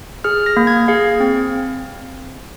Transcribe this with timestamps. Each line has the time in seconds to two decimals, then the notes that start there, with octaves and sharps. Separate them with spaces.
0.24 G#4 F6
0.46 A#6
0.57 A#3
0.67 G#6
0.88 G#4 F5
1.20 C4